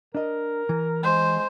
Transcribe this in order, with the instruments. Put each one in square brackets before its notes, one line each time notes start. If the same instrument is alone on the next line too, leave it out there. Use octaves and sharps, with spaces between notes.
[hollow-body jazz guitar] D4 D#5 [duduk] A#4
[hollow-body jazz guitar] E3
[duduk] G#3 [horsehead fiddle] C5